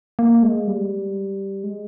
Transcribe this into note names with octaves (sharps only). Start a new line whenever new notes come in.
A#3
G#3
G3
G#3